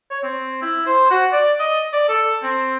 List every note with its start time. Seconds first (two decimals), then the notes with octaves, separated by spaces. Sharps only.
0.10 C#5
0.23 C4
0.62 E4
0.86 C5
1.11 F#4
1.32 D5
1.59 D#5
1.93 D5
2.08 A4
2.43 C4